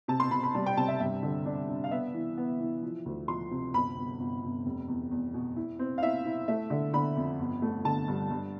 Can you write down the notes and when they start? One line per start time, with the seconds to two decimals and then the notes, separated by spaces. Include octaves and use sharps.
0.08 C3 A5
0.20 C6
0.31 C3 B5
0.43 B5
0.54 G3 A5
0.66 G5
0.77 C3 A5
0.88 E5
1.00 G2 E5
1.23 D3
1.46 D4
1.69 D4
1.84 F5
1.91 B3 E5
2.14 E3
2.37 B3
2.60 E3
2.83 F3
3.05 D2
3.28 F3 C6
3.51 C3
3.74 G1 B5
3.97 G1
4.19 G1
4.43 G1
4.65 F1
4.88 E2
5.11 E2
5.34 B2
5.56 E4
5.79 C4
5.98 F5
6.02 E4 E5
6.25 E4
6.48 A3 E5
6.70 D3
6.93 D3 B5
7.17 F2
7.39 G1
7.62 A3
7.85 D3 A5
8.08 G2
8.31 G2